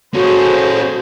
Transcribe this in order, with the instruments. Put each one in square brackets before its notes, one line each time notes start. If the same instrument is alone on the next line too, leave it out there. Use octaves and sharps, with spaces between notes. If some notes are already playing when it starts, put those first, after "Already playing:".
[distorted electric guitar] C#4 A4 [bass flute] F#4 [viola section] G#4 C5